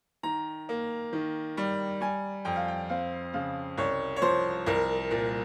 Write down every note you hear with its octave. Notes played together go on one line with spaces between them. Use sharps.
D#3 A#5
A#3
D#3
G3
G3 G#5
F2 G5
F5
G5
C4 F5
C#3 F5
C2 C#5
C#5
F3 C5
C2 A#4
A#2 A#4